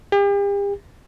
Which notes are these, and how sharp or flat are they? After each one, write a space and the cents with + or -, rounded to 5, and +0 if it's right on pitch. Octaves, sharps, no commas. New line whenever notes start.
G4 +40